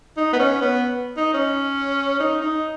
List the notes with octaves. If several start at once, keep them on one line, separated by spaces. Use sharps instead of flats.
D#4
B3
C#4
B3
D#4
C#4
D#4
D#4